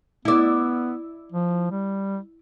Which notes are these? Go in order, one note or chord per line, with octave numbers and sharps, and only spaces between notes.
B3 E4 D5
F3
G3